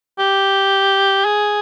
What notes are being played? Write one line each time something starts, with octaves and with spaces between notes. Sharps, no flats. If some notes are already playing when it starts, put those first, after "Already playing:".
G4
G#4